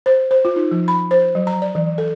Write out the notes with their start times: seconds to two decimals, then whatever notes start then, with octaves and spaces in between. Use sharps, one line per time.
0.06 C5
0.31 C5
0.45 F4
0.56 D#4
0.71 F3
0.88 B5
1.11 C5
1.35 F#3
1.47 A#5
1.62 D5
1.75 E3
1.98 A4